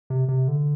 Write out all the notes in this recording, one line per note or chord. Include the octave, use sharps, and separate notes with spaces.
C3
C3
D3